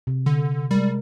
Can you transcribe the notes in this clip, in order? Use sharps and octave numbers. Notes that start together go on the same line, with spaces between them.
C3
D3
G3 G#3 A#4